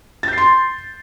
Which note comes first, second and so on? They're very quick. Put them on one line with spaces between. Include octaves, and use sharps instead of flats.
A6 G6 C7 C6